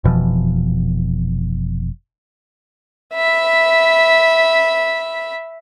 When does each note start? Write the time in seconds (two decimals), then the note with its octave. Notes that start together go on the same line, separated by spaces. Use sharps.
0.04 F1 B2 E3 F3
3.14 E5 B5